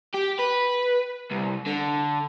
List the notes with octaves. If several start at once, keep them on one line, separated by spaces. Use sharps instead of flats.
G4
B4
C2
D3